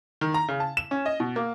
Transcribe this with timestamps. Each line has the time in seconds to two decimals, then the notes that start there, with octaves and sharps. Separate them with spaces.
0.21 D#3
0.34 A#5
0.48 C#3
0.60 A5
0.77 E7
0.91 C#4
1.06 D#5
1.20 B2
1.36 A#3